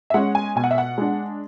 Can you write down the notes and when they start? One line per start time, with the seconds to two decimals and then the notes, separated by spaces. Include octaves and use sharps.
0.10 E5
0.14 G#3 C#4 F#5
0.35 G#5
0.56 B2 G#5
0.64 F#5
0.71 E5
0.78 F#5
0.98 G#3 D4